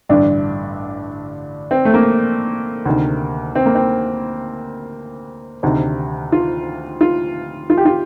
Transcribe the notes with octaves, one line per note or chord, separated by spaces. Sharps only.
A1 G2 D3 D4
C4
A3
A#3
D2 C3 D#3
C4
A#3
C4
D2 C3 D#3
F4
F4
F4
G4
F4